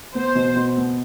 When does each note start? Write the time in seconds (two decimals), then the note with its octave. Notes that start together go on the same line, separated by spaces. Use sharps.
0.15 B3 C5
0.35 B2
0.55 B2
0.77 B3